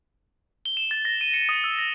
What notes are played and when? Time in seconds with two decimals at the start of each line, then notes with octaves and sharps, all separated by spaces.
0.65 G7
0.77 E7
0.91 A6
1.05 A#6
1.21 D#7
1.34 C#7
1.49 D#6
1.64 E6
1.78 A#6